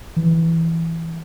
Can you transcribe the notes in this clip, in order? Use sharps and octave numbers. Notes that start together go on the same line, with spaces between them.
E3